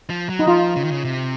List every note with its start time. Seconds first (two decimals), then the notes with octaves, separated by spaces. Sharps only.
0.10 F3
0.29 F#3
0.39 D#4
0.47 F3 F4
0.76 C#3
0.84 D#3
0.91 C#3
1.05 C3